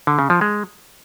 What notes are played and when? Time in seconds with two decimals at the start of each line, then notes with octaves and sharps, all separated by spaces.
0.07 D3
0.19 C#3
0.30 F3
0.41 G#3